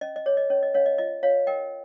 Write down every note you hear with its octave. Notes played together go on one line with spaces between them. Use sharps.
C#4 D#5
D#5
G#4 C#5
D#5
C#4 C#5
D#5
C#4 C#5 F5
D#5
F4 D#5
F4 C#5 F5
A#4 D#5 G5